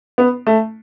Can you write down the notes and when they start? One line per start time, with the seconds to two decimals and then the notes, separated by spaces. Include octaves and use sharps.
0.18 B3
0.47 A3